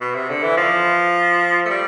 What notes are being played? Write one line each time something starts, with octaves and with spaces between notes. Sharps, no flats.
B2
C3
D3
E3
F3
A3
G3